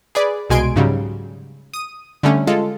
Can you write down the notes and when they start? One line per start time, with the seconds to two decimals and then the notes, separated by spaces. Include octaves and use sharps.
0.15 G#4 B4 D5
0.50 C2 B2 G#3 G#5 C6 D7
0.76 G#2 C#3 F#3 G3
1.74 D#6 D#7
2.23 D3 G3 A3 C#4
2.47 G#3 F4 A4